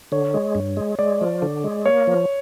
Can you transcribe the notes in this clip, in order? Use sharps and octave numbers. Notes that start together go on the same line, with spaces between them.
D3 C#5
G#3
G2
G#3
G#3 D5
F3
D3
G#3
A#3 C#5
F3